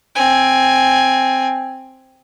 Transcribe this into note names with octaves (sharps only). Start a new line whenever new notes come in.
C4 G#5